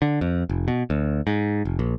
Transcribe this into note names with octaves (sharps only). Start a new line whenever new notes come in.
D3
F2
F1
B2
D2
G#2
F1
A#1